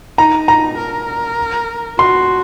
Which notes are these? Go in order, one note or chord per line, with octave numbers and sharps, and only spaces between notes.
D#4 A#5
A#5
A#4
F#4 C6